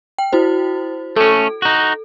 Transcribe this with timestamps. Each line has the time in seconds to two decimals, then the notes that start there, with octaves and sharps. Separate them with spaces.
0.18 G5
0.33 E4 F#4 C5
1.16 A3 C#4 A4
1.62 D#4 F#4